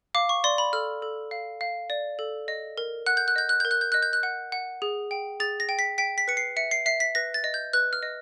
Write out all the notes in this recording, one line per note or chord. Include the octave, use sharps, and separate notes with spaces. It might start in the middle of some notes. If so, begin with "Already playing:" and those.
F5 D6
C#6
D5 C6
B5
A4 F6
A4
F5
F5
D5
A4
D#5
A#4
F#5 F#6
G6
F#6
D#5 G6
F#6
A#4 G6
F#6
G6
D#5 F#6
G6
F#6
F#5
F#5
G#4
G5
G#4 A6
A#6
G5
B6
G5 B6
B6
B4 C#7
C7
E5 C#7
C7
E5 C7
B6
B4 A#6
A6
D#5
G6
B4 F#6
F6
D#5